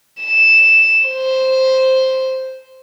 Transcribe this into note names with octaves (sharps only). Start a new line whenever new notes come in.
E7
C5